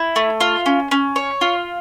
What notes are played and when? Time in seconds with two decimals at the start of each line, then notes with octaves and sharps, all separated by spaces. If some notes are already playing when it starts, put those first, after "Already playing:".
Already playing: E4
0.16 A3
0.41 F4
0.66 C#4
0.91 C#4
1.16 C#5
1.41 F4